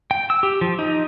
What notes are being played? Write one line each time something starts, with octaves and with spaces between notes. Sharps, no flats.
G5
E6
G4
F3
D#4